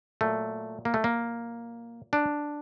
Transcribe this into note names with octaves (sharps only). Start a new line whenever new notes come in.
A#2 F#3 A3
A#3
A3
A#3
D4